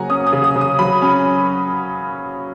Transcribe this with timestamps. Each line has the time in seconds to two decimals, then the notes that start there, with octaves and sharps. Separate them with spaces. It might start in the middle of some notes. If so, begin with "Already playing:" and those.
Already playing: C#3 F#3 A#3 F#5 G#5 A#5
0.09 C#4 D#6
0.27 D#6
0.33 C#3
0.44 D#6
0.56 C#3
0.61 D#6
0.79 F#3 B5
1.02 C#4